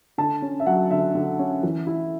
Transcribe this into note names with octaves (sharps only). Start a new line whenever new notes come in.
D3 A5
C#4
E5
F#3 F#5
D3 E5
D3
C#4
E3
E4